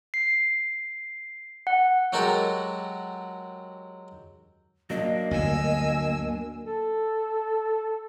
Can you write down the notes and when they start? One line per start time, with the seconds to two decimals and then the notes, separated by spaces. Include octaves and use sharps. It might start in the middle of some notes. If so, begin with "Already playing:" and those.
0.14 C7
1.67 F#5
2.13 F#3 G#3 F#4 G4 A4 A#4
4.90 F#3 A#3 D4 D#5
5.31 D2 G2 D3 G#5 E6
6.65 A4